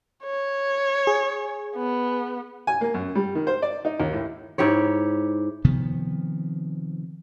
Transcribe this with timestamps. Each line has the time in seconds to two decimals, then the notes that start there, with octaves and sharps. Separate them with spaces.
0.24 C#5
1.07 G#4
1.76 B3
2.67 G#5
2.81 A#3
2.94 F#2
3.15 G3
3.35 D#3
3.47 C5
3.62 D5
3.85 D#4
4.00 D#2
4.13 A2
4.58 G#2 E4 G4 C#5
5.65 C3 D#3 F3 B3